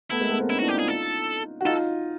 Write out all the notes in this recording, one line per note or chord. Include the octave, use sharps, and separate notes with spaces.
A3 B3 E4
G#3 A#3
A3 B3
A#3 C4
C#4 D#4 E4
D4 E4 F#4
G4
D#4 F4 G#4
A4
F#4
D#4 F4 A4